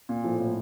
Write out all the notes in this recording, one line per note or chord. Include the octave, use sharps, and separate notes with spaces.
A#2
A2 F3
A#2